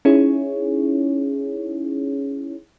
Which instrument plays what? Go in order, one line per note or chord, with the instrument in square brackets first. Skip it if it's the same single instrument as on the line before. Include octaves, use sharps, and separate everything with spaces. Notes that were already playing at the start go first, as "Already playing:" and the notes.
[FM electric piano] C#4 D#4 E4 G#4 C#5